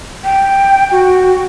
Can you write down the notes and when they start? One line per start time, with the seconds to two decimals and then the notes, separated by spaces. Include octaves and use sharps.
0.24 G5
0.91 F#4